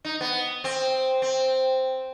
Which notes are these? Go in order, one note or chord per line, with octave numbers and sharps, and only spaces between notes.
D#4
B3
C4
C4